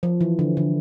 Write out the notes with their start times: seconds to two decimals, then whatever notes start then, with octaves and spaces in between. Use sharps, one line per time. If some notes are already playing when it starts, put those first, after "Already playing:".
0.03 F3
0.21 E3
0.39 D3
0.57 D3